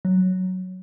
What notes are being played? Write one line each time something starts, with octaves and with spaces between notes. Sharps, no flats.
F#3